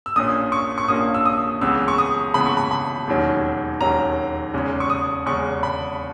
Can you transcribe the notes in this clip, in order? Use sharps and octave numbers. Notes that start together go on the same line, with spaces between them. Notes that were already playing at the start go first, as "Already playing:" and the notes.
E6
A#1 A#2 A#3 C#4 D#6
C#6
C#6
A#1 A#2 A#3 C#4 D#6
E6
D#6
C#2 C#3 E3 B3 E6
C#6
D#6
C#2 C#3 E3 B3 B5
C#6
B5
B5
E1 D#2 D#3 F#3 C#4
E1 D#2 D#3 F#3 C#4 A#5
E2 C#3 G#3 C#4
C#6
D#6
E2 C#3 G#3 C#4 C#6
B5